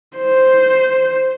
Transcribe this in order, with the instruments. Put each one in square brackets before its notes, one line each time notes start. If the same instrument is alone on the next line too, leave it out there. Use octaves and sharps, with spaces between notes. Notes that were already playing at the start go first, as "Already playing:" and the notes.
[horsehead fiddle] C5